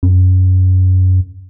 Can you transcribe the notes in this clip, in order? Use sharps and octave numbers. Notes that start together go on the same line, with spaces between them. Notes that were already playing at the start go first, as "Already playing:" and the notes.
F#2